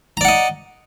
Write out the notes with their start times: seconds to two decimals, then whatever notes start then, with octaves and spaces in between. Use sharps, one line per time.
0.17 A#5
0.21 D5
0.25 F#5
0.28 D#5